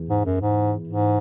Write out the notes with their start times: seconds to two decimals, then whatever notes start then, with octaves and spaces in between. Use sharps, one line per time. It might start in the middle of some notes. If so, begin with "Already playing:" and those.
Already playing: E2 E3 B3
0.09 G#2
0.25 F#2
0.41 G#2
0.88 G#2